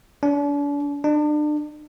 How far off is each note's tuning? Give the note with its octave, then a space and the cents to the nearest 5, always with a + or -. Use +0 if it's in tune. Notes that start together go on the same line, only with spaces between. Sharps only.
D4 -40
D4 +35